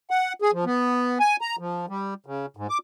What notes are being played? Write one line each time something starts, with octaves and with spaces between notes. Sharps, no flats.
F#5
G#4
F3
B3
G#5
A#5
F3
G3
C#3
G#2
D6